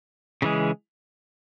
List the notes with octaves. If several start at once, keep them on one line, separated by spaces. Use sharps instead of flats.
C#3 E3 G#3